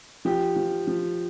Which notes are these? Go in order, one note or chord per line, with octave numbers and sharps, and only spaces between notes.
F3 G4
F3
F3